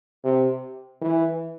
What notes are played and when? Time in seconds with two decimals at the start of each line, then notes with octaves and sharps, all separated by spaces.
0.24 C3
1.01 E3